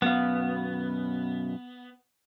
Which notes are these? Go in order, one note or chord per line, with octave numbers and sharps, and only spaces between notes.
F#2 B2 B3 F5